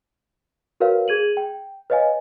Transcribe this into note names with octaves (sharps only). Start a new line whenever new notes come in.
F#4 A#4 B4 C#5 F5
G#4 G#6 D#7 F#7
G5
B4 C#5 D#5 F5 G#5